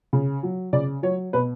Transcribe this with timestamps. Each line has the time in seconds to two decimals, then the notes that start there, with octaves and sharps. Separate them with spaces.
0.13 C#3
0.43 F#3
0.73 C#3 D5
1.03 F#3 C#5
1.33 B2 B4